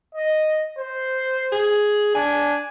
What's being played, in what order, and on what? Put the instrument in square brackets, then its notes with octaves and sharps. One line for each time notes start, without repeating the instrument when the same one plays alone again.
[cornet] D#5
C5
[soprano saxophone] G#4
[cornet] D4 [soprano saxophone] G#5